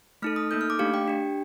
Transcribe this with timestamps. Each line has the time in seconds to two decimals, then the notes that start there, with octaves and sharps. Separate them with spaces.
0.22 A3 D#4 A4 F6
0.36 D#6
0.51 A#3 D#4 A4 G6
0.61 F6
0.70 D6
0.79 A3 D4 G4 F5
0.94 G5
1.08 D4 G4